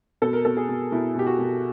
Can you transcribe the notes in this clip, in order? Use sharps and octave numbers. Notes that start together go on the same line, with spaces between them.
B2 A4
A#4
B2 A4
G#4
B2
B2 E4
B2 G4
F#4
B2